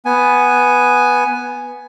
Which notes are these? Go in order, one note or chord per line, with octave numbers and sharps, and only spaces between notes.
B3 G#5